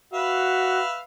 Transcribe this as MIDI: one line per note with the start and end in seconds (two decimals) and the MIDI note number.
0.14 0.82 66
0.14 1.01 71
0.14 1.01 76
0.14 1.01 77